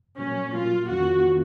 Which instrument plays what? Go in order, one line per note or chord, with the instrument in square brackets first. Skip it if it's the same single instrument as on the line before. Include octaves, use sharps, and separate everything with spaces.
[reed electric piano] A#2 F#3 A#3 [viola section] C#4
[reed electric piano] A#2 F#3 A#3 [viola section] F4
[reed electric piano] F2 D#3 A#3 C#4 F4 [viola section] F#4
[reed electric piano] D#3 A#3 C#4 F4